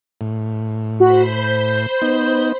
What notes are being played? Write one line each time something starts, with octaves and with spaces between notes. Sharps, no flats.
A2
F#4 C5 B5
G6
B3 D#4